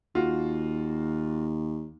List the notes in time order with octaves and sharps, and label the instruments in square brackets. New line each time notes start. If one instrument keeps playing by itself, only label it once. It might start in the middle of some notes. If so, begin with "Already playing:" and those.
[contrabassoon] D#2 [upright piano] F4 F#4